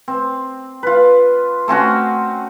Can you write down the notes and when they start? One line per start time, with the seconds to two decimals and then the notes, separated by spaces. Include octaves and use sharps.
0.08 C4
0.83 F4 B4
1.68 A3 C4 C#4 F#4